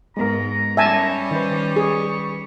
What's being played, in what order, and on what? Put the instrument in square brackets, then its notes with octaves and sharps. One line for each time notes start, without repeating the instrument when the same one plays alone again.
[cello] G#2 [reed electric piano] G#3 B3 A#4 [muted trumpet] A#5
[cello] G3 C#4 [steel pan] E5 G#5 A5
[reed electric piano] D#3 B4 [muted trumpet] C5
[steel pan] G#4 [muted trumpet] C#6